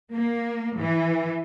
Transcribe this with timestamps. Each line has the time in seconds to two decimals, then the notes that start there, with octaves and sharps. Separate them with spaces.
0.13 A#3
0.77 E3